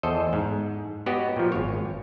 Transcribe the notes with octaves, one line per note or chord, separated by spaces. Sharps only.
E2 A4 C5 D#5
G#2
B3 F#4 G4 C#5 D#5
A#2 F3
G#1 C#5